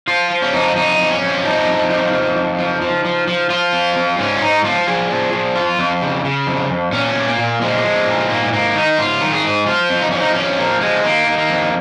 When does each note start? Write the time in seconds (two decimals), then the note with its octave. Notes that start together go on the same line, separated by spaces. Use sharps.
0.08 F3 F4
0.30 F3
0.42 C#4
0.53 F2 D#4
0.76 F2 D#4
0.99 F2
1.10 C#4
1.22 F2
1.44 F3 D#4
1.67 F2
1.90 F3
2.13 F2
2.36 F2
2.59 F3
2.81 F3
3.05 F3
3.27 F3
3.50 F3 F4
3.73 F2
3.96 F2
4.19 G#2 C#4
4.36 F4
4.41 G#2 D#4
4.64 F3 F4
4.87 F3 G#4
5.10 F3
5.33 F3
5.56 F2 F4
5.79 F2
6.02 C#3
6.25 C#3
6.47 F2
6.70 F2
6.92 A#2 C#4
7.16 A#2
7.27 A#3
7.38 A#2
7.61 F3 G#3
7.84 F3
8.07 A#2
8.30 G#2 A#3
8.52 G#2 A#3
8.75 D#3 D#4
8.98 G#2 F4
9.21 D#3
9.33 G#4
9.44 G#2
9.66 F3 F4
9.90 F2
10.01 D#4
10.11 F3 C#4
10.20 D#4
10.35 F2 C#4
10.58 F3 A#3
10.81 F3 G#3
11.04 D#3 A#3
11.27 D#3
11.38 A#3
11.49 F2